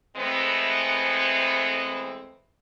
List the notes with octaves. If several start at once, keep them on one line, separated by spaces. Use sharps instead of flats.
E3 G#3 A3 B3 C4